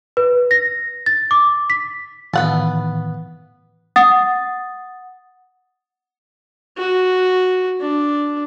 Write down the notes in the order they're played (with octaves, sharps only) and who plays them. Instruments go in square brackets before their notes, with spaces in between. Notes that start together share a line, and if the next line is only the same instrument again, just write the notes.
[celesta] B4
A#6
A6
D6
B6
[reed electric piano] A2 D#3 E3 [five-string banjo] B3 F#5 A5
[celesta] F#5 D#6 A6
[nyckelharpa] F#4
D4